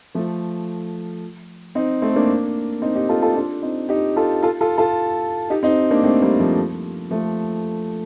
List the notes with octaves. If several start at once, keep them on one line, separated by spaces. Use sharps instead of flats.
F3 A3
C4 D#4
A3 C4
A#3 D4
C4 D#4
D#4 G4
F4 A4
F4 A4
D4 F4
C4 D#4
D#4 G4
F4 A4
F4 A4
F4 A4
F4 A4
D#4 G4
C4 D#4
A#3 D4
A3 C4
G3 A#3
F3 A3
F3 A3